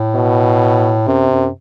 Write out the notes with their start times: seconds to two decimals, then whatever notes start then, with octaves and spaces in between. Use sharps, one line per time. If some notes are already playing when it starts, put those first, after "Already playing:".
Already playing: A2
0.15 B2
1.07 F#2 C3
1.30 F#2